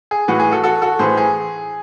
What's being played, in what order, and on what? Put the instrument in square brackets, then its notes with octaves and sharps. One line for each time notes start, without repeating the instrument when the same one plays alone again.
[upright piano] G#4
A2 E3 F#4
G#4
F#4 A4
F#4 A4
F#4 A4
A2 E3 G#4 C5
G#4